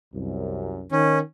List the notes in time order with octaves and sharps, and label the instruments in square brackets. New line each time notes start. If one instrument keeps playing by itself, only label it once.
[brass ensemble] C2 F#2
[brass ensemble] D#3 [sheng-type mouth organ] C#4